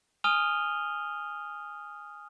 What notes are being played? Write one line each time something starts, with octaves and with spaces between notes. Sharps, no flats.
G#5 D#6 F6 D#7 F7 G7